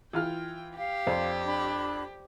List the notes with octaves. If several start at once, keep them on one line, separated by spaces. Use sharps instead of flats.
E3 F4 G5 F6
G4 F5
F2 C5 D5
D4 B5